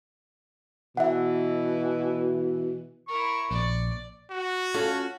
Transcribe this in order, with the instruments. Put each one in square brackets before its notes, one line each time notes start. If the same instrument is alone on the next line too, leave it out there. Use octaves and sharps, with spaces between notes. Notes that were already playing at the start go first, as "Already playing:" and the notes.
[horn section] B2 E3 [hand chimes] E5 F#5
[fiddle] E4 A#4 [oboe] C#6
[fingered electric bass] A#1 [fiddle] D5
[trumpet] F#4
[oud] C#4 F4 A4